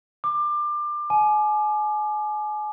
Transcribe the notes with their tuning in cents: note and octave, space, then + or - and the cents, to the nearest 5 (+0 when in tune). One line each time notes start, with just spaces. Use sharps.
D6 +25
G#5 +35